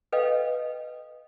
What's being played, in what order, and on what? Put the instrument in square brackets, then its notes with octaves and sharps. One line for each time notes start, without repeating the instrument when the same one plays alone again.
[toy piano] A4 B4 D#5 F5 G5